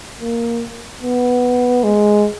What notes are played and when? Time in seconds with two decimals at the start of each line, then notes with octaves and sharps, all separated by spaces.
0.21 A#3
1.03 B3
1.84 G#3